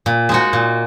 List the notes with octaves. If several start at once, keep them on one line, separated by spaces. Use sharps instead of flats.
A#2
G#3 D#4 F#4
A#2